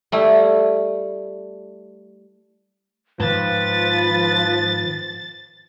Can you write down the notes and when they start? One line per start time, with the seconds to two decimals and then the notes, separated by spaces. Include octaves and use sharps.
0.12 G3 A3 E4
3.20 G#2 D#3 F3 B4 A6